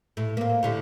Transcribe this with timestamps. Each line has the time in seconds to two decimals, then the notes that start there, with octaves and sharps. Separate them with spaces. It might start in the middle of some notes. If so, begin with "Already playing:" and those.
0.17 A2
0.37 A#3 C4
0.63 A2 D3 G3